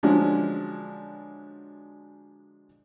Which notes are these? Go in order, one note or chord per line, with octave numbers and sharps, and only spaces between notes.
D3 F3 F#3 G#3 C#4 D4